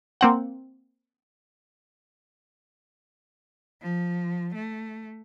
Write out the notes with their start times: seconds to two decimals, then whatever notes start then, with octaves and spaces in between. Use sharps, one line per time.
0.21 A#3 C4 F#5
3.82 F3
4.55 A3